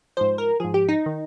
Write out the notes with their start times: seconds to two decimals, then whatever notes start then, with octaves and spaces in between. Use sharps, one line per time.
0.17 G#2 F3 C5
0.38 A#4
0.60 G#2 F3 G#4
0.74 G4
0.89 D#4
1.06 D#3